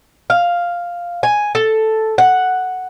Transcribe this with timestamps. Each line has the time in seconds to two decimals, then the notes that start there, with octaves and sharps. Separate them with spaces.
0.30 F5
1.23 G#5
1.55 A4
2.18 F#5